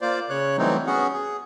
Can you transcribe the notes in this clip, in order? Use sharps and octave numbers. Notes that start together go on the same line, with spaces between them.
A#3 F4 C5 D5
C#3 C#5 F#6
E3 F#3 G3 A3 C4 D#4
B3 C#4 F#4 G#4 F#5
G#4